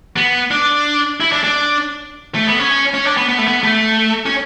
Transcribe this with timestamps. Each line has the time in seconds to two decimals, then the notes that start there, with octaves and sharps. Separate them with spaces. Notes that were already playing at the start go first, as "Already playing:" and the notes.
0.16 B3
0.51 D4
1.20 E4
1.32 D4
1.44 D4
2.35 A3
2.47 B3
2.59 C#4
2.94 C#4
3.05 D4
3.17 B3
3.29 B3
3.38 A3
3.47 B3
3.63 A3
4.26 C#4